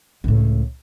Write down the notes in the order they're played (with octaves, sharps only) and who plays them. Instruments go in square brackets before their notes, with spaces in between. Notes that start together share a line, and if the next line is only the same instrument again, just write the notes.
[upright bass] C#2 A2